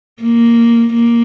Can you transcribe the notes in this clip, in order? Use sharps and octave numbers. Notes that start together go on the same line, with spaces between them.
A#3
A#3